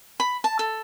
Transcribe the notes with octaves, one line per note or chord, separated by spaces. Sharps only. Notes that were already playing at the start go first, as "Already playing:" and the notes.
B5
A5
A4